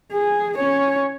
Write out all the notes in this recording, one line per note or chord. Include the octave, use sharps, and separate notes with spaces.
G#4
C#4 C#5